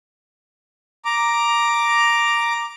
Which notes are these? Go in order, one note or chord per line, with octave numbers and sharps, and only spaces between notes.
A#5 D6